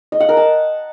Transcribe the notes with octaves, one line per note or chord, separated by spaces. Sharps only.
D#5
F#5
A#4
A5